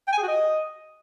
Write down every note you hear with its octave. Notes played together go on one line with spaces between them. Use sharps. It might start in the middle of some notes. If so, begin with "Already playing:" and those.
G5
G#5
G#4
F#4
D#5